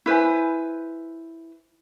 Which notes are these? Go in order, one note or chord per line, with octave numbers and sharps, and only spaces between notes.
E4 B4 C5 G#5